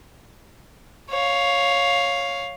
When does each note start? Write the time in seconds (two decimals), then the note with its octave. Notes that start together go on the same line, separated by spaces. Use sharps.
1.10 C#5 F5